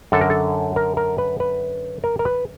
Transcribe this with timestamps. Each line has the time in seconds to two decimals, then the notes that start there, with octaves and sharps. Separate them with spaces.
0.12 F#2 D3 A4
0.21 A#4
0.30 A4
0.76 A#4
0.97 A#4
1.18 B4
1.40 B4
2.04 A#4
2.19 A#4
2.25 B4